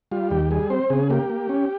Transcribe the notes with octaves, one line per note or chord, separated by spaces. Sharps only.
G3 F4
D#2 G4
G3 G#4
C4 C5
C#3 G#4
A#3 G4
A#3
C#4